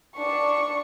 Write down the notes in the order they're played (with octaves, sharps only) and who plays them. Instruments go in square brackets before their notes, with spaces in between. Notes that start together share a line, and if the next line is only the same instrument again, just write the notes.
[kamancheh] D4 C#6